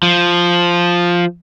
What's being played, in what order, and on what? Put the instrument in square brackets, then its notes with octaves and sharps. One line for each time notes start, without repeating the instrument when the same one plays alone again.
[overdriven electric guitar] F3